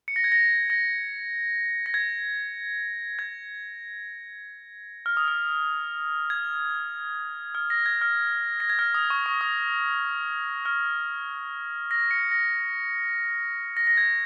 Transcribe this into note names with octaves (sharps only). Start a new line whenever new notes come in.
C#7
A#6
G#6
A#6
A#6
A#6
G#6
G#6
F6
D#6
F6
G#6
F6
A#6
G#6
F6
A#6
G#6
F6
D#6
C#6
C#6
D#6
F6
A#6
C#7
A#6
A#6
A#6
G#6